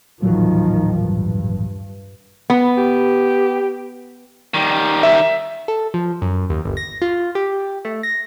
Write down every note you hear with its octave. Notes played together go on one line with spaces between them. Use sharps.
D#1 A1 D#3 F3 F#3
G2
B3
G4
D#3 G3
E5
A4
F3
F#2
D#2
G1
A#6
F4
G4
A3
A#6